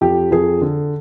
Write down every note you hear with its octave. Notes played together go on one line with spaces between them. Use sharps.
F2 G4
F2 G#4
D3